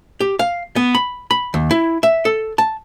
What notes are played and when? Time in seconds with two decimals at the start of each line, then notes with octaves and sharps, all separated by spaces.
0.20 G4
0.39 F5
0.76 B3
0.95 B5
1.31 B5
1.54 D#2
1.71 E4
2.03 E5
2.25 A4
2.58 A5